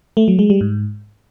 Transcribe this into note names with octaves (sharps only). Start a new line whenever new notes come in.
A3
F#3
G#3
G3
G#2